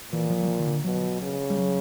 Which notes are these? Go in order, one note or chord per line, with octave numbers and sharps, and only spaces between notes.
A#2 E3
F3
F#3
F3
D#3
D3
B2 F#3
C#3
G3
F#3